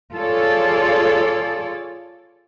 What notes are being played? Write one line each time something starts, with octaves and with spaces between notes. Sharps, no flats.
F4 G#4 A4 C#5 D5